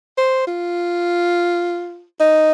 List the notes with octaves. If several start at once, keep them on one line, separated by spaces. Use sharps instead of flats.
C5
F4
D#4